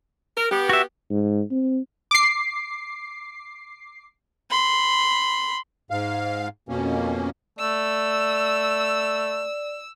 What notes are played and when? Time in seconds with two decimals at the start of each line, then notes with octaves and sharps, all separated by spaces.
0.35 A#4
0.50 B3 G4
0.69 F#4 E5
1.10 G#2
1.51 C4
2.11 D6 C7
4.50 B5 C6
5.91 G#2 F5
6.69 F2 B2 A#3 C#4
7.59 A3 D5 E6